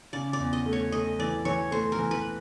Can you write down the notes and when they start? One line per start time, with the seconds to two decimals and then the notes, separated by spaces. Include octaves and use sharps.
0.13 C#3 D5
0.33 D5
0.40 E2
0.53 D#5
0.66 A3
0.73 C#5
0.92 A3 D#5
1.19 E3 D5
1.45 E3 C#5
1.71 A3 C5
1.92 A#4
1.99 E3
2.11 B4